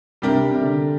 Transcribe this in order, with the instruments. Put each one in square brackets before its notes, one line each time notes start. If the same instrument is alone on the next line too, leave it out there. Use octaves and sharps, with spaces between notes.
[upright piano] C3 [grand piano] G3 D4 G4 A#4
[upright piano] C3
D3